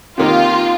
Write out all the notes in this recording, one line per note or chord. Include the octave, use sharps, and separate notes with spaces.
C3 D#3 A#3 D#4 F4